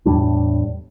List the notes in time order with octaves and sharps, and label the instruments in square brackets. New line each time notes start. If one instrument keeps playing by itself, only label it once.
[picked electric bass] E2 A2 G3 D4